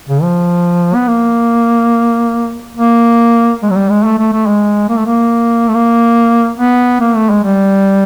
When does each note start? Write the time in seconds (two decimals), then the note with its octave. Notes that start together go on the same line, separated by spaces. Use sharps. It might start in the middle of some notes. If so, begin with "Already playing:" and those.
0.09 C#3
0.22 F3
0.95 B3
1.08 A#3
2.77 A#3
3.62 G#3
3.70 F#3
3.76 G3
3.89 G#3
4.04 A3
4.18 A3
4.33 A3
4.47 G#3
4.89 A#3
4.98 A3
5.06 A#3
5.68 A3
5.74 A#3
6.58 B3
7.00 A#3
7.15 A3
7.30 G#3
7.44 G3